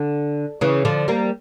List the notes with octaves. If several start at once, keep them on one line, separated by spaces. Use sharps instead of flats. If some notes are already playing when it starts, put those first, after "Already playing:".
Already playing: D3
C#3 E3
D3 F3
G3 A#3